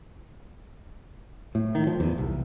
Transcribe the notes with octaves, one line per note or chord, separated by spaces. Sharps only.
A2
D#3
F3
E2
C2